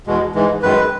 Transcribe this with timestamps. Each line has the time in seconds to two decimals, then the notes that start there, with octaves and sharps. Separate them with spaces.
0.07 E2 B2 G#3
0.35 G#2 E3 G#3
0.63 F#2 D#3 G#3 B4